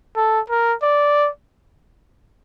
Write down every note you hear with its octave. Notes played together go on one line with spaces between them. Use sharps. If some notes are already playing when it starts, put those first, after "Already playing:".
A4
A#4
D5